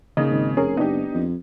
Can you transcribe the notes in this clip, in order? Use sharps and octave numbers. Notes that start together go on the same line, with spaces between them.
C#3 A#3 D#4 D#5
G#1
F1 C#4 G#4 A#4
F#1 B3 D4 D#4 G4
F2